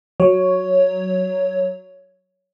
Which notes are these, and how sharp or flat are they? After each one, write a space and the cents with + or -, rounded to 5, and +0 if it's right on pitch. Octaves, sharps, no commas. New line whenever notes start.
F#3 +0 C#5 +5